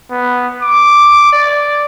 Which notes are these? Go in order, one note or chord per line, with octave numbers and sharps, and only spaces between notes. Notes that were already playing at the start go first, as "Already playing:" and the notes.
B3
D6
D5